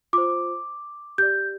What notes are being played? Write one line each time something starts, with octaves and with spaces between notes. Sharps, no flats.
F4 C5 D6
G4 D5 G6